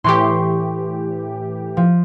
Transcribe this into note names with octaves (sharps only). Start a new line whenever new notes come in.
A2 E3 G4 C6 C#6
F3